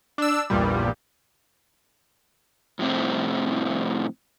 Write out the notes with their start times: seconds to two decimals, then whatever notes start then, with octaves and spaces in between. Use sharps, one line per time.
0.18 D4 E6
0.50 A#1 E2 G2 A#2 G3
2.79 F2 A2 C3 C4